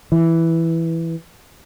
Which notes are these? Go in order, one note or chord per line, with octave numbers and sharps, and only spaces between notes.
E3